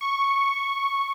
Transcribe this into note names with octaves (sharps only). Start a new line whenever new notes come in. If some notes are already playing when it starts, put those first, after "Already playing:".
C#6